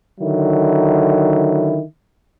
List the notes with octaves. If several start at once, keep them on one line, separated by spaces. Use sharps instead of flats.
D3 D#3 F#3 E4